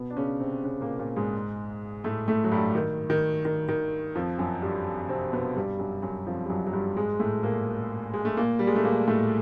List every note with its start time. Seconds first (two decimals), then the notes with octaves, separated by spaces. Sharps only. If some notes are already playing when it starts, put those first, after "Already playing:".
Already playing: B2 B3
0.10 D4
0.17 C#3 C#4
0.40 C3 C4
0.64 C#3 C#4
0.81 A#2 A#3
0.99 A#2 A#3
1.16 G#2 G#3
2.04 A2 A3
2.28 A2 A3
2.44 F#3
2.52 G2 G3
2.75 D#3
3.10 D#3
3.45 D#3
3.69 D#3
4.15 F2 F3
4.39 F#2 F#3
4.62 G2 G3
5.09 C3 C4
5.33 B2 B3
5.56 G2 G3
5.79 F#2 F#3
6.02 F#2 F#3
6.26 F2 F3
6.45 G3
6.50 F#2 F#3
6.67 F#3
6.73 G2 G3
6.97 G#2 G#3
7.20 A2 A3
7.43 A#2 A#3
8.14 G#3
8.25 A3
8.37 A#2 A#3
8.59 G3
8.67 G#3
8.76 A3
8.84 A#2 A#3
9.08 A2 A3